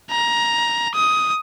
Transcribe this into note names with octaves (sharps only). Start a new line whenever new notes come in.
A#5
D#6